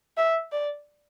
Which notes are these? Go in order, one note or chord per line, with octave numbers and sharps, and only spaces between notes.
E5
D5